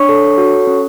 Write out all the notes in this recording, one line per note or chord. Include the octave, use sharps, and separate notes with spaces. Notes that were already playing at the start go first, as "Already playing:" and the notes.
Already playing: D4 C#5 C#6
A4
F#4
C#4